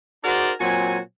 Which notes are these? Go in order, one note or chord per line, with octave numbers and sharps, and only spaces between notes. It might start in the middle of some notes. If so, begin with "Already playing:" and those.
D#4 F#4 G#4 A#4 C5 D5
A#2 F#3 C4 F#4 G#5